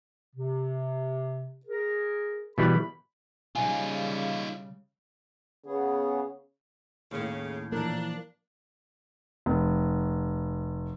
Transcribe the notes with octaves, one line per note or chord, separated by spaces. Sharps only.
C3
G#4 A#4
B2 E3 G3 B5
C#3 G3 D#4 F4 G#5
C#3 B3 G#4
D#2 A2 C#3
A#2 E3 F3 A#3 D4 A#4
F1